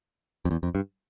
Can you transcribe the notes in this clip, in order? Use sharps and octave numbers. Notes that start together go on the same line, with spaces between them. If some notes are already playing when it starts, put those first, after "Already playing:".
F2
E2
F2
G2